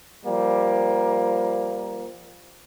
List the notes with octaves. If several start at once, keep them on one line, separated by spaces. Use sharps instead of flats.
F3 G3 A#3